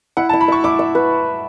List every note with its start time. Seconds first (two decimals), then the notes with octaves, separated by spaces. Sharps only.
0.17 E4 F#5
0.29 A5
0.33 E4
0.41 B5
0.48 E5 C#6
0.64 E4 D6
0.79 E5
0.95 B4